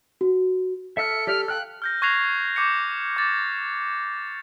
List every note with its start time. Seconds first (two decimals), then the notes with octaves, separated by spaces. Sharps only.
0.21 F#4
0.97 A4 E5 E6 F6 C#7
1.27 G4 D5 F6
1.48 F5 G5 F6 F#6
1.82 F6 G6 A#6
2.02 C#6 F#6 G#6 A#6 C7 F7
2.56 C#6 D6 G6 C#7
3.17 D6 A6